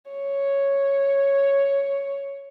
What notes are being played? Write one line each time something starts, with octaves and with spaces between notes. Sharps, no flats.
C#5